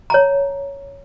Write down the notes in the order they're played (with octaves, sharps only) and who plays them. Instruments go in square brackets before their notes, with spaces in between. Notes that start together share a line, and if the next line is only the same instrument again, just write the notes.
[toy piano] C#5 A5 A#5